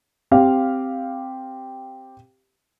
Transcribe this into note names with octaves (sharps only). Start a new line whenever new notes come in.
C4 G4 F5